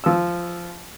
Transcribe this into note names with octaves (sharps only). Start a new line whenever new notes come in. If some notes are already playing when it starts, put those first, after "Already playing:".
F3 E6